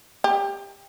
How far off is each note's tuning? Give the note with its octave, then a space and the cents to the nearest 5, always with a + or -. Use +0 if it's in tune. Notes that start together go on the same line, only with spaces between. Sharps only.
G4 +20